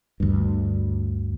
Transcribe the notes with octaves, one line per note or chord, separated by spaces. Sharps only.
D2 G2